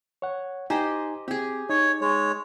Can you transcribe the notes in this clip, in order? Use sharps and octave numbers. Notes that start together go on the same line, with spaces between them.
C#5 F#5
D#4 G4 C5 D#5 G#5 A#5
C4 G4 G#4
D#4 C#5
G#3 C#5